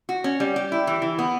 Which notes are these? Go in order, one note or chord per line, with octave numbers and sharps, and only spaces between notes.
F#4
C#4
G3
G4
E4
E3
E3
B3